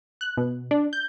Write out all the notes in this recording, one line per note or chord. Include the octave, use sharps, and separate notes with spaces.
F#6
B2
D4
G6